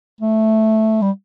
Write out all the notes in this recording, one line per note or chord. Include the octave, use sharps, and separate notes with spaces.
A3
G3